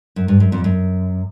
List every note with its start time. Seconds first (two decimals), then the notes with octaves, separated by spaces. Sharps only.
0.16 F#2
0.28 G2
0.40 F#2
0.52 F2
0.64 F#2